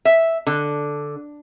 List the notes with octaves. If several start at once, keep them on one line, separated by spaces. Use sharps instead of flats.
E5
D3